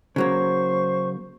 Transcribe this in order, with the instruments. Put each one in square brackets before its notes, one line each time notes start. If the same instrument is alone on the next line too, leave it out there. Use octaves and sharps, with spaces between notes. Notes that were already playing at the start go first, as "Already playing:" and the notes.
[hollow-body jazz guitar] C#3 F#3 A#3 [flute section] C5 C#6